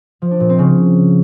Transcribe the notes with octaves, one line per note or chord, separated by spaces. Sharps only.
F3
D4
A#2
C4
C#3